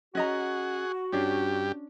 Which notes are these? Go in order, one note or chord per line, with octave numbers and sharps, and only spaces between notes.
C#4 F#4 G#4 D#5 F#5 A#5
G2 C#4 D4 G4